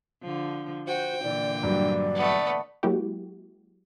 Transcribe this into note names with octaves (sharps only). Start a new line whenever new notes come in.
D3 F3
F#4 C5 G5
A#2 D3 E3 D5
G2 F#3 D5
A3 B3
F#3 G#3 A#3 E4 F#4 G4